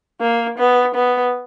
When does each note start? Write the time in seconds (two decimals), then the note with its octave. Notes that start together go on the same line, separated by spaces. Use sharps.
0.21 A#3
0.59 B3
0.95 B3